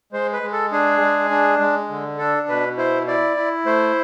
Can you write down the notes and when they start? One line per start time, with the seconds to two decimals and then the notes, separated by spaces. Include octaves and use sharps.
0.13 G#3 C5
0.33 B4
0.43 G#3
0.53 A4
0.72 D4 G#4
1.01 G#3
1.31 D4
1.60 G#3
1.89 D3
2.18 D4 A4
2.49 B2 B4
2.77 E4 C5
3.07 E4 D5
3.37 E4
3.65 A3 C5